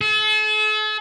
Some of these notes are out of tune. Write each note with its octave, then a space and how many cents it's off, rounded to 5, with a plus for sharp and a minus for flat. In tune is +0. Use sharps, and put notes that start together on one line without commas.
A4 -45